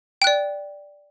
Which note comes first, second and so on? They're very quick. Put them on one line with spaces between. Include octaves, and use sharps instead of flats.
G5 F#6 D5